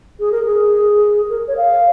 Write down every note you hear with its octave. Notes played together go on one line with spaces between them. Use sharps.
G#4
A#4
G#4
A#4
C#5
F5